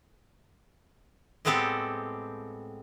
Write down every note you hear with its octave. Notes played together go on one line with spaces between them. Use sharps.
A2 G#3 B3 C4 G4 A4